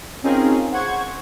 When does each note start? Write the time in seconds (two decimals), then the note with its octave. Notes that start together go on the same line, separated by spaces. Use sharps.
0.23 C4 C#4 D#4 F4 G#4 A#4
0.72 C5 F#5 C#6 G#6